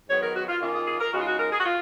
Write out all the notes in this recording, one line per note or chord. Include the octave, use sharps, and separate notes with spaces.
G#2 D#3 F#3 B3 C#5
A#4
F#4
F4
D#3 A#3 C#4 F4
G#4
G#4
A#4
C#3 G#3 D#4 F#4
F4
F#4
A#4
G#4
F#4
F4